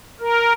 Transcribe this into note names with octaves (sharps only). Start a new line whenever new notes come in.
A#4